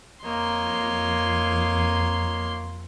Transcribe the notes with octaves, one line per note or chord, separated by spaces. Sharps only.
F2 A#3 D#4 C#5 C6